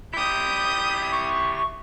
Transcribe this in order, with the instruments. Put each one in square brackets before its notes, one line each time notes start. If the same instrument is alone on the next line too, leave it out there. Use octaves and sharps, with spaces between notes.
[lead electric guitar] E4 G4 [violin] D#6 G6
[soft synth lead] C#6